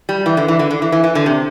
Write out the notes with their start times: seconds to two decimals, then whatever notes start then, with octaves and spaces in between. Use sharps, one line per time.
0.09 G3
0.26 E3
0.37 D3
0.48 E3
0.59 D3
0.71 D3
0.82 E3
0.92 E3
1.04 E3
1.15 D3
1.26 C3